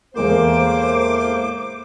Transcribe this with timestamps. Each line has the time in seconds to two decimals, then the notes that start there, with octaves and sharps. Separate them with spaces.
0.16 E2 A2 G#3 A#3 A#4 C5 D6